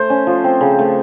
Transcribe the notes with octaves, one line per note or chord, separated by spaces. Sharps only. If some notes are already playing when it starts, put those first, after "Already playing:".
Already playing: A3 C5
C#4
F3
C4
C#3
A3